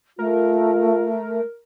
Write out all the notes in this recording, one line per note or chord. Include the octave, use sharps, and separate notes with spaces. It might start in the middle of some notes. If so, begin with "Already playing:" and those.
A3 F4 A#4